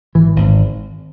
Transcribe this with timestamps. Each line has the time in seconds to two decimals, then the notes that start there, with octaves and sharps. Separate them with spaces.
0.15 G#1 E3
0.36 G#1